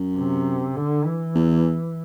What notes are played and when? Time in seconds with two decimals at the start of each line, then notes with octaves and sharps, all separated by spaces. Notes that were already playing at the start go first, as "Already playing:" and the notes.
Already playing: F#2
0.17 C3
0.76 D3
1.05 E3
1.35 E2